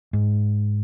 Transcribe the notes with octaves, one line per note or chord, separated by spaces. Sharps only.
G#2